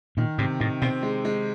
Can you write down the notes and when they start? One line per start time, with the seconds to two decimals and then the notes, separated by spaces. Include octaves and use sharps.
0.17 A#2 D#3
0.38 G#2 C3
0.60 A2 D#3
0.82 B2 C4
1.03 G#3
1.25 G#3